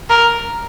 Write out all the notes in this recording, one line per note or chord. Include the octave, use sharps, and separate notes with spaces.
A#4